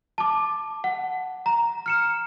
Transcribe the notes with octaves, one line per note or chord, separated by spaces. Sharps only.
A5 D6
F#5
A#5
F6 C#7 E7